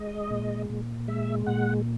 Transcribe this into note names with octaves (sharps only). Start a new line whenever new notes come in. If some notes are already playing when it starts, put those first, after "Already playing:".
Already playing: G#3 D#5
A#2
A#2
G#3 E5
A#2 F#5